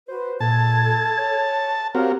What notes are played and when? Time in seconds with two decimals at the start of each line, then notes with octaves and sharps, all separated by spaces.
0.08 F#4 B4 C5
0.40 A#2 A4 A5 G#6
1.18 C#5
1.95 C4 F#4 G4 A#4 C#5 F5 F6